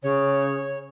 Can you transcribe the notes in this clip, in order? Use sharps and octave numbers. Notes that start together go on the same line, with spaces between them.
C#3 C#5